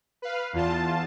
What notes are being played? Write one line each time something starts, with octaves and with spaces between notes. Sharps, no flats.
B4 F5
E2 F4 A5